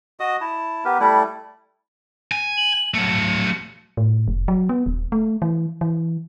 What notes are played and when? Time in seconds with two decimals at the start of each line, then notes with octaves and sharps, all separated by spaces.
0.20 F#4 D#5 D#6
0.41 E4 A5
0.85 B3 G4 A#4 B4
1.00 G3 A3 E4
2.32 G#5
2.57 F#7
2.94 F#3 A3 C#7
3.97 A2
4.28 F1
4.48 F#3
4.69 B3
4.86 D#1
5.12 A3
5.42 E3
5.81 E3